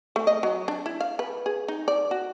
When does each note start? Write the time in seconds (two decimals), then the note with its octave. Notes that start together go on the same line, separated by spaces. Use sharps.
0.16 A3
0.27 D#5
0.43 F#3
0.68 D4
0.86 E4
1.00 F5
1.19 B4
1.46 G#4
1.68 D#4
1.88 D5
2.11 F#4